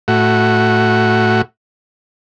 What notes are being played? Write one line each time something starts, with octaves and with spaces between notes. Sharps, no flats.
A2 F#4